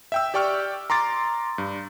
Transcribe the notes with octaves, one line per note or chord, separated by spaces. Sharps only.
E5 G5 E6
G4 D5 G5 C#6 F6
A#5 C6 D6 A6
G2